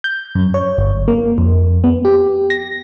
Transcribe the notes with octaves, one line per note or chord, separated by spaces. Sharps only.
G6
F#2
C#5
G1
A#3
F2
B3
G4
A#6